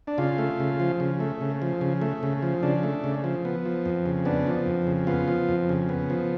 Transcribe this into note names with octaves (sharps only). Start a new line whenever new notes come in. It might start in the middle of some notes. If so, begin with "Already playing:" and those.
D4
C#3 F4
A3
C#3
F3
C#3
A3
C#3
F3
C#3
A3
C#3
F3
C#3 D4
A3
C#3
F3
B3
F3
F2
C#3
B3 D4
F3
F2
C#3
B3 F4
F3
F2
C#3
B3
F3